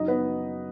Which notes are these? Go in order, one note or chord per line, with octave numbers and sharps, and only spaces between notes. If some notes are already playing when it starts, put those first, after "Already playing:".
Already playing: F#1 F#3 D#4 D#5
B3 B4